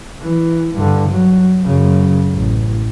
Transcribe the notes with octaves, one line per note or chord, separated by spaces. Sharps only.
E3
G2 D3
F#3
F#2 C#3
A1